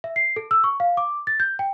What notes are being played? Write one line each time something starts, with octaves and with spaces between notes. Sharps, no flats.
E5
C7
A4
E6
C#6
F5
D6
A6
G6
G5